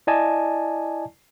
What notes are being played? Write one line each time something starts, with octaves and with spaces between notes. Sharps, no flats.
E4 D5 D#5 G#5 A5